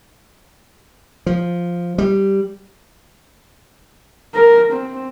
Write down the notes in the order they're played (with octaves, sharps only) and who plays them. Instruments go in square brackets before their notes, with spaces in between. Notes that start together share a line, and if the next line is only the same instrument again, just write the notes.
[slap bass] F3
G3
[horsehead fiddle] A#4
C4